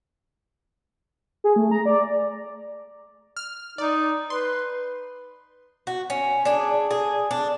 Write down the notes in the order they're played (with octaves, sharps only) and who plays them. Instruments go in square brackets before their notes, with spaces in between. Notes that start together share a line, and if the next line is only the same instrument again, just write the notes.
[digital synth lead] G#4
A3
A#5
D5
F6
[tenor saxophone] D#4 [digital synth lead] D5
[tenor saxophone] B4 [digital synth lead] C6
[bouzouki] F#4
C#4
D4 G#4
G#4
D4